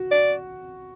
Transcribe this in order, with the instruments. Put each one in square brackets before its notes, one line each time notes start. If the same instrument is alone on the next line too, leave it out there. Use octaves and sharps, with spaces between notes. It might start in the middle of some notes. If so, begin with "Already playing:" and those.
Already playing: [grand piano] F#4
[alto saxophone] D5